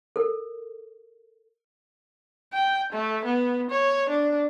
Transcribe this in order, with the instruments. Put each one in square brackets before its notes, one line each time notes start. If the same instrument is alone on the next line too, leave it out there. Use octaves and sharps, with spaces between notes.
[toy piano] A4 A#4
[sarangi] G5
A3
B3
C#5
D4